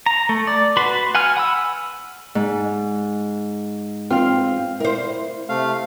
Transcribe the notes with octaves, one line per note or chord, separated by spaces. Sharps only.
A#5
A3
D5
F#4 B4 F#5 B5 C6
F#5 G#5 F6
F#5 B5 E6
G#2
C4 F4 F5
E4 A#4 C5
C3 A3 F5